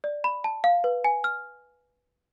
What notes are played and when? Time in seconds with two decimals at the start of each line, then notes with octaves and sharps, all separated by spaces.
0.04 D5
0.24 B5
0.44 A5
0.64 F5
0.84 B4
1.04 G#5
1.24 F6